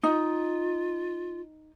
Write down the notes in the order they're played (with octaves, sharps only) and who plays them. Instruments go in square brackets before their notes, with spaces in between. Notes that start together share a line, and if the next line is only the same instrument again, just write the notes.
[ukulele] D#4 [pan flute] F4